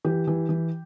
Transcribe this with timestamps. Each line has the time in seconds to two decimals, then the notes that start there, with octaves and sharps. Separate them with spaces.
0.05 E3 G4
0.27 E3
0.49 E3